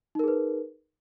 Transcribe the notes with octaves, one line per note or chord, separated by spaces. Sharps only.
D#4 G#4 A#4 B4